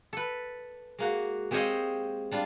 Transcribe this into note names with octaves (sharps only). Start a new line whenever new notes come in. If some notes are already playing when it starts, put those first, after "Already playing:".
A4 B4
G#3 A#3 F#4
G#3 C4 G4 C#5 D#5 F5
G3 D4 F4